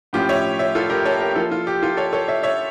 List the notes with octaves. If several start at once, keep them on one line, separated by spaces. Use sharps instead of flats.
A2 F3 C#4 F4 G4
C#5 E5
C#5 E5
F4 A4
G4 A#4
A4 C#5
G4 A#4
F3 A#3 E4 F4 A4
F4
G4
F4 A4
A4 C#5
A4 C#5
C#5 E5
C#5 E5